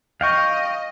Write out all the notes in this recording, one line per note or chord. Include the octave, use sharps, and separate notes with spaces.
D#5 F5 G5 C#6